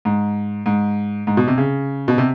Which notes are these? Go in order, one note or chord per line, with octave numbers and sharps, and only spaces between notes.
G#2
G#2
G#2
B2
C3
C#3
B2
C3